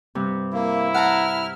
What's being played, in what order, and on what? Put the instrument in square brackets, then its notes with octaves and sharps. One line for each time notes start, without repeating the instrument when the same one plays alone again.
[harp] G2 C3
[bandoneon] A#3 [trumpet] E4
[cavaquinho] F#5 A5 A#5 [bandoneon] F6